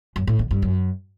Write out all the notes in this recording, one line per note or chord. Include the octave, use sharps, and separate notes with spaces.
F#2
A2
D3
G2
F#2